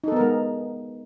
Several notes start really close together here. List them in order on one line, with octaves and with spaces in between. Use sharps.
D#4 A4 B3 A#4 G#3